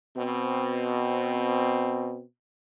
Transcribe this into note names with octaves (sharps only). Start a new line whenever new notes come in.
B2 C4